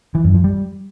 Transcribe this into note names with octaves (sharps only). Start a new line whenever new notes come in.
E3
F#2
F3
G3